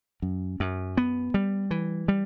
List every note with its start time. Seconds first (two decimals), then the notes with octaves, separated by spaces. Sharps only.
0.22 F#2
0.60 F#2
0.97 B3
1.34 G3
1.71 E3
2.08 G3